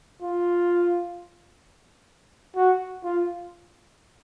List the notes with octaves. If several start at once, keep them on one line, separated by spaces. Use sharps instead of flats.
F4
F#4
F4